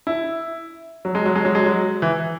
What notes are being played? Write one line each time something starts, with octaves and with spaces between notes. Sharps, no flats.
E4
F#3
G#3
F#3
G#3
F#3
G#3
F#3
E3